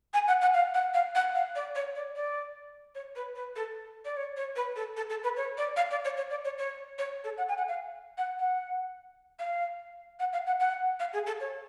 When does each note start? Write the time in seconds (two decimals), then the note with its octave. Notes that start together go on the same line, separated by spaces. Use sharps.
0.14 G#5
0.28 F#5
0.41 F#5
0.54 F5
0.74 F#5
0.94 F5
1.15 F#5
1.35 F5
1.56 D5
1.75 C#5
1.95 D5
2.16 D5
2.95 C#5
3.16 B4
3.36 B4
3.56 A4
4.05 D5
4.17 C#5
4.37 C#5
4.56 B4
4.76 A4
4.97 A4
5.10 A4
5.24 B4
5.37 C#5
5.58 D5
5.77 F5
5.91 D5
6.05 C#5
6.17 C#5
6.30 D5
6.45 C#5
6.58 C#5
6.98 C#5
7.24 A4
7.38 F#5
7.49 G#5
7.58 F#5
7.68 F5
8.18 F#5
8.39 F#5
9.39 F5
10.20 F#5
10.33 F5
10.47 F#5
10.60 F#5
11.00 F5
11.13 G#4
11.27 A4
11.40 C#5